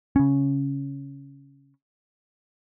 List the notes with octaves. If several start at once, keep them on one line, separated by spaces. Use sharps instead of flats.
C#3 C#4